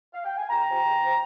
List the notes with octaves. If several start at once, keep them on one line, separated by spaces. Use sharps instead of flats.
F5
G5
G#5
C#2 G5 A#5
C3 F3 C4
C#2
C3 F3 C4